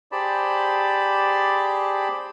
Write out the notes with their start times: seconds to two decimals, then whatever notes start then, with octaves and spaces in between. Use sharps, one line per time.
0.12 G4 G#4 C5 D5 A5 B5